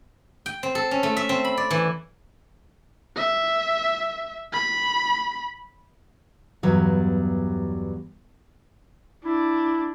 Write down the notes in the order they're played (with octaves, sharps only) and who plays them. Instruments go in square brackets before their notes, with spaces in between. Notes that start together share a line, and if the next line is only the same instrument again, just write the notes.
[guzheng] G5
C4
A4
C#4
A3
E5
C4
B5
D5
E3
[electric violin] E5
B5
[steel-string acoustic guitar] E2 G2 F#3 G3
[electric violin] D4 [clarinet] E4